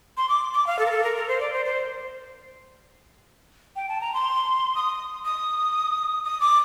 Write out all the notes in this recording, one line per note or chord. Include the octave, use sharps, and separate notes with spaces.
C6
D6
D6
F5
A4
A#4
A4
A#4
A#4
C5
D5
C5
C5
G5
A5
A#5
C6
D#6
D#6
D#6
D6